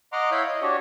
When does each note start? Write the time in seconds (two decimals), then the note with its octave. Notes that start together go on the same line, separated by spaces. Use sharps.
0.12 D#5 F#5 A#5 C6 D6
0.31 E4 C#5 F5 B5 G6
0.47 D#5
0.62 D4 F#4 G4 C#5